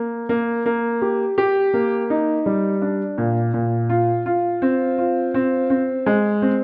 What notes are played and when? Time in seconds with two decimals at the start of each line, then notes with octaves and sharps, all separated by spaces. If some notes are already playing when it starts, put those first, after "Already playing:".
Already playing: A#3
0.29 A#3
0.66 A#3
1.02 G4
1.38 G4
1.74 A#3
2.10 D#4
2.46 G3
2.82 D4
3.18 A#2
3.54 A#2
3.90 F4
4.26 F4
4.62 C4
4.98 F4
5.34 C4
5.70 C4
6.06 G#3
6.42 C4